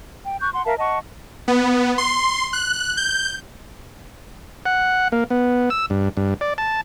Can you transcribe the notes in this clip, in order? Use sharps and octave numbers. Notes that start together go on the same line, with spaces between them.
G5
C#6 F#6 G6
F#5 C6
A#4 E5 F5 A5
D#5 F#5 A5 C#6
B3
C6
F#6
G6
F#5
A#3
B3
E6
G2
G2
D5
A5